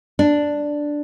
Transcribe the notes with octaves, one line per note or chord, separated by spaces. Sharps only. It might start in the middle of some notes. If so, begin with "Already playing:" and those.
D4